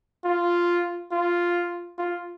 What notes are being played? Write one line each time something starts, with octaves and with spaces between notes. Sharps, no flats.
F4
F4
F4